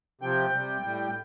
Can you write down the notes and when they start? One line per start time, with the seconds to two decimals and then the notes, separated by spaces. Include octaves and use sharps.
0.21 C3 F3 G5
0.53 C3 G3
0.83 A2 G3